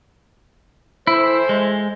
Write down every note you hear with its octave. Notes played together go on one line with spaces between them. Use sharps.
E3 A3 E4 C5
G#3